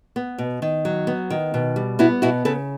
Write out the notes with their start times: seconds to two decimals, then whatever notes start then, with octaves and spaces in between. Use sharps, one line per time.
0.16 B3
0.38 B2
0.62 D#3
0.85 F#3
1.07 B3
1.30 D#3
1.54 B2
1.76 G3
1.99 B3 E4 F#4
2.22 B2 E4 F#4
2.45 C#3 A4 B4